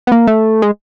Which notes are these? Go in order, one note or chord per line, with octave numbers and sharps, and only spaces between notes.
B3
A#3
A3
G#3